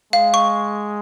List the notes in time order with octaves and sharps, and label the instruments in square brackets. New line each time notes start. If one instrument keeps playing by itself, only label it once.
[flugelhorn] G#3 [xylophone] F5
[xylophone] C#6